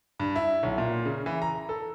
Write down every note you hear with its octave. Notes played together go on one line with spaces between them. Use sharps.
G2
E4
B1
A#2
C#3
E3
A#5
A4